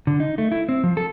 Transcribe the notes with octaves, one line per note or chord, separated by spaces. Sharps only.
D3
D#4
A3
E4
C4
F3
A4